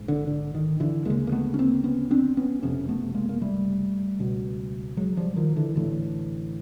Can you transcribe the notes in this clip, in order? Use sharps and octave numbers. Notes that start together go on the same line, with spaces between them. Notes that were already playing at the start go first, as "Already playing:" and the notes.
Already playing: A#1 G#2
D3
D3
D#3
D3 E3
D2 C#3 G#3 A#3
A#3
A3 B3
C#4
A#3 C4
B3 C#4
C4 D4
B3 C#4
F#1 F2 C3 B3 C#4
A3 B3
G#3 A#3
A#3
G3 A3
C#2 B2
F#3 G#3
F3 G3
D#3 F3
D3 E3
A1 A2 D3 E3